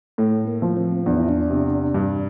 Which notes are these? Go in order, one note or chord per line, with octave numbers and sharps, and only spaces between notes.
A2 A3
A#3
F3
C4
E2 D4
E4
D4
C3
G2